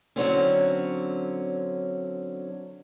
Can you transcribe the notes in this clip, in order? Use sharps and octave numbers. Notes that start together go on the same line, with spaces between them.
D3 F#3 C4 C#4